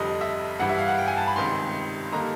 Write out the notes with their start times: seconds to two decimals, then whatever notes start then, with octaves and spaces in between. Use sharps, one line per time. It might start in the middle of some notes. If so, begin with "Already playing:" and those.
Already playing: F1 F2 D3 G3 D#5
0.21 E5
0.60 G2 E3 G3 F#5
0.69 E5
0.78 F5
0.88 F#5
0.98 G5
1.08 G#5
1.17 A5
1.27 B5
1.36 C#2 C3 D#3 G3 C6
2.13 D3 G3 A#3 D#4 A#5